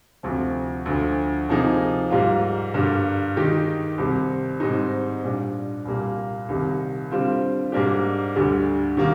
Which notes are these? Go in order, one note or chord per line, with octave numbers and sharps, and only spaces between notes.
D2 C3 F3
D2 D3 F3
C3 F3 A#3 D#4 G#4
G#2 G3 A#3 F4
G2 D3 G3 A#3
D#3 G#3 D#4 G4
C2 C3 D#3 G3 C4
G#2 G3 C4 D#4
A#2 G3 D4
C2 A#2 G3 A#3
C2 C3 D#3 G3
D3 G3 C4 F4
G#2 G3 A#3 D4 G4
D2 D3 G3
D#3 G3 A#3